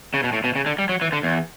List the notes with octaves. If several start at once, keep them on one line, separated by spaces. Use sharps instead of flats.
C#3
B2
A2
B2
C#3
D3
G3
F#3
E3
D3
E2